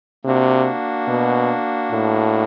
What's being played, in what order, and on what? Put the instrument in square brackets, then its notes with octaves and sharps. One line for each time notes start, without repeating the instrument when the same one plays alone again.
[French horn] C3 [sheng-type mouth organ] A#3 D4 F#4
[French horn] B2
A2